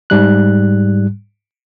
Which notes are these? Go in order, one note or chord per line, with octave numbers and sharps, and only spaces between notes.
G#2 G3 F#6